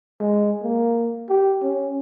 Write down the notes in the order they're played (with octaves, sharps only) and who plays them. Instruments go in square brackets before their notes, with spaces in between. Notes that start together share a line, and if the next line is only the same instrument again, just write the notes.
[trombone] G#3
A#3
G4
C#4